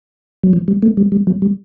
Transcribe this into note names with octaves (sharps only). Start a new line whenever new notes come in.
F#3
F3
G3
A3
G3
G3
F#3
G3